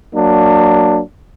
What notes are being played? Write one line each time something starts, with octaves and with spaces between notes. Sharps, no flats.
F#3 A#3 D4